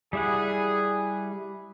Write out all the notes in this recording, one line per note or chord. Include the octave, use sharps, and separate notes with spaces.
G3 E4 G#4 F#5